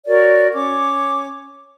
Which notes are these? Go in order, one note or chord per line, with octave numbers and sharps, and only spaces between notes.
F#4 A#4 C#5 D5
C#4 C#5 D6